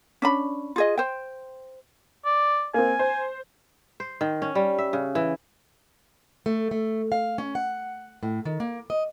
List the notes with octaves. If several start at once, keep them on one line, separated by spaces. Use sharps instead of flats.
C#4 D4 B5
F4 G#4 D#5
C5 G5
D5
A#3 C4 G#5
C5
C5
D#3
C#4
G3
E5
C#3
E3
A3
A3
F5
C#4
F#5
A2
D#3
A#3
D#5